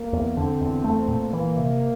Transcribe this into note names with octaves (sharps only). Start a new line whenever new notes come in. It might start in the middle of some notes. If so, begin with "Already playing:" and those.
Already playing: A#3
E2
D3 C4
E2
A3
A#2
E3 A#3
C3